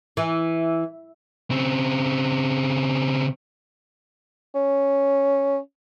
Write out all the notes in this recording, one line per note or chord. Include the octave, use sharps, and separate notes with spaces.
E3
C#3 C4
C#4